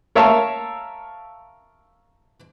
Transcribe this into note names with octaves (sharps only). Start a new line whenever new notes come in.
A#4 C#5 E5 F5 A5